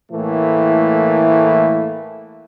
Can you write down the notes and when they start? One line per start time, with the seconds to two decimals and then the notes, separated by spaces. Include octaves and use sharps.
0.12 A2 E3 A3 A#3